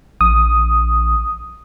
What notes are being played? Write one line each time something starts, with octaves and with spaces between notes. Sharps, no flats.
A#1 D#6